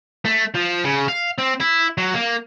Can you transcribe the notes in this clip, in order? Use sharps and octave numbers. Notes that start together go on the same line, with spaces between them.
A3
F3
C#3
F5
C4
E4
F#3
A#3